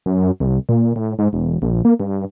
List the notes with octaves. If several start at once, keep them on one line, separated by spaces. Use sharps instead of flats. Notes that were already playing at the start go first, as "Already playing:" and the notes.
F#2
C2
A#2
A2
G#2
E1
A#1
A#3
G2